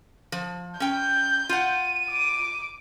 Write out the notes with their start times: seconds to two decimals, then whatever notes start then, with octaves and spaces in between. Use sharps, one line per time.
0.32 F3
0.80 C#4 G5 G6
1.49 F4 F#5 D#7
2.10 D6